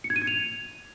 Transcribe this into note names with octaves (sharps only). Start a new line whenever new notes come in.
C#7
G#6
D#7
G#6
F7